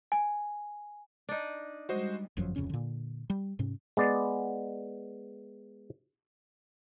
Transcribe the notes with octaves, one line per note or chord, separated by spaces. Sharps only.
G#5
D4 D#4
G3 G#3 F#4 C5 D#5
G1 F#2 F3 F#3
D1 F2 C#3 C#4
A#2 D3
G3
G#2 C3 C#4
G#3 B3 D5